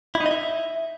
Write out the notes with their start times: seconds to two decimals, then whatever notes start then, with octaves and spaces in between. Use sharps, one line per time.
0.15 E4
0.20 D#4
0.26 D#5
0.31 E5